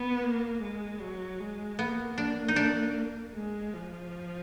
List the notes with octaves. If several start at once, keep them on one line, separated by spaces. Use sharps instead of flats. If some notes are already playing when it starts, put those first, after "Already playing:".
Already playing: B3
A#3
G#3
F#3
G#3
A#3 B3
A#3 D4
D#4
D4
G#3
F3